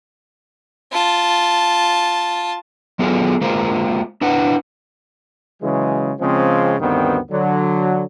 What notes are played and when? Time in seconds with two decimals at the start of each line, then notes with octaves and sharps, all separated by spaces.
0.92 F4 A5
2.99 F#3 B3 F4 G#4 A4 D5
3.41 G#3 A#3 F4 A#4 C5
4.21 D4 E4 B4 F#5
5.62 C#3 E3 F#3 G#3
6.19 C#3 F3 G#3 C4
6.80 D2 G2 D#3 B3 C4
7.30 D3 F#3